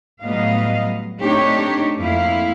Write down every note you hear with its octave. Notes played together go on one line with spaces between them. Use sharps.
A2 F#3 G3 B3 D#5 F5
A3 C4 D4 D#4 G4 C#5
F2 F3 A#3 E4 F5